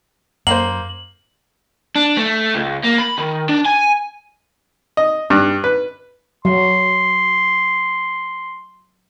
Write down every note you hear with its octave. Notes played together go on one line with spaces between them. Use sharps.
F#2 A#3 C5 F#7
D4
A3
C#2
A#3
B5
D#3
D4
G#5
D#5
G2
B4
F#3 C6